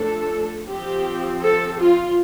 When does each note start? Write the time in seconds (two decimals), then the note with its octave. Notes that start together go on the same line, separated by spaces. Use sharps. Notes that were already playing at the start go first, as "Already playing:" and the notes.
Already playing: F3 A3 D4 A4
0.67 F3 C4 G4
1.42 A4
1.79 F4